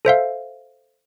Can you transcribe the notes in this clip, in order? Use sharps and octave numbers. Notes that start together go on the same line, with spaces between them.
A4 C5 E5 F5